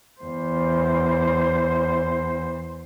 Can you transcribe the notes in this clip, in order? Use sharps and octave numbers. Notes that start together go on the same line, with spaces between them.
E2 C5